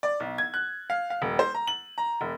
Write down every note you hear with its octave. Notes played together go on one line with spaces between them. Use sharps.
D5
B1
G#6
F#6
F5
F5
D#1
C5
A#5
F#7
A#5
E1